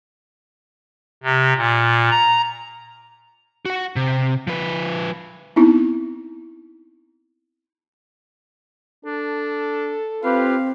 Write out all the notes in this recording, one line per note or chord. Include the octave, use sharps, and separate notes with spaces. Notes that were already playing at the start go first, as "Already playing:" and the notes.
C3
A#2
A#5
F#4 F#5
C3
F3 B4
B3 C4 D#4 E4
D4 A4
C4 F4 G4 B4 F5